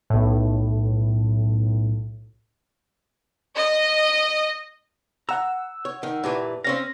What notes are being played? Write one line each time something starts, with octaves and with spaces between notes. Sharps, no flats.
B1 A2
D#5
F#5 A#5 E6
C#5
D#3
G2 A#2 E3
C4 C#4 F5 A#6